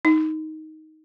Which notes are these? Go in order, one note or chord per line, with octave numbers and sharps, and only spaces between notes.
D#4